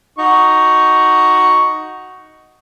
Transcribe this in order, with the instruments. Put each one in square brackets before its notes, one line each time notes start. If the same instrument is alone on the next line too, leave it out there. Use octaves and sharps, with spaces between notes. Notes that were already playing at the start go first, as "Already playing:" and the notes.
[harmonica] D#4 F#4 C#6